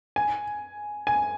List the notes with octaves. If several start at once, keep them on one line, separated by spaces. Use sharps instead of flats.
G#5
G#5